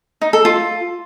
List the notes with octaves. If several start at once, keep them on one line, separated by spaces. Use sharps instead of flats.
D#4
A4
F4